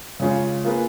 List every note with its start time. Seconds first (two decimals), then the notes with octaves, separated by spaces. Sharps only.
0.20 C#3 G#3 C#4 F4
0.64 A#3 F4 G#4 B4